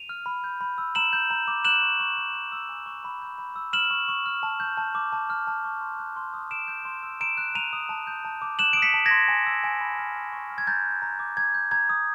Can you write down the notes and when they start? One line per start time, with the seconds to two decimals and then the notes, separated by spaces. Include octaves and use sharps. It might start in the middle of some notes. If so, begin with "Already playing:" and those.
Already playing: D#7 F7
0.09 F6
0.26 B5
0.44 G6
0.61 B5
0.78 E6
0.95 A#5 E7 F#7
1.13 G6
1.30 A#5
1.48 D6
1.65 F#6 E7 F#7
1.82 C#6
2.00 C#6
2.17 F#6
2.34 G6
2.52 E6
2.69 G#5
2.86 C#6
3.05 B5
3.21 G6
3.38 B5
3.56 E6
3.73 F6 E7 F#7
3.91 C#6
4.08 C#6
4.26 F6
4.43 A5
4.60 G6
4.77 A5
4.95 D6
5.13 A5
5.30 F6
5.47 A5
5.65 C#6
5.81 C6
5.99 F#6
6.16 C6
6.34 D#6
6.51 C6 D7 E7
6.68 G6
6.85 C6
7.03 E6
7.21 A#5 D7 E7
7.37 F#6
7.55 A#5 D#7 F7
7.73 D#6
7.89 A5
8.07 G6
8.25 A5
8.42 D6
8.59 F#6 E7 F#7
8.73 D#6 D7
8.82 B6 C#7
8.94 A5
9.06 G#6 A#6
9.11 C6
9.28 G#5
9.46 E6
9.64 G#5
9.81 B5
9.98 F6
10.16 C#6
10.32 C#6
10.50 F6
10.58 G#6
10.67 A#5 G6 A6
10.85 F#6
11.02 A#5
11.19 D6
11.37 A#5 G#6
11.54 G6
11.71 A#5 G#6
11.89 D#6